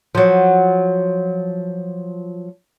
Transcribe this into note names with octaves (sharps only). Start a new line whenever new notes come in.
F3 F#3